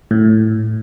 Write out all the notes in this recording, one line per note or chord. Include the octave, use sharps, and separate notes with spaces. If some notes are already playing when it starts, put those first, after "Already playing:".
A2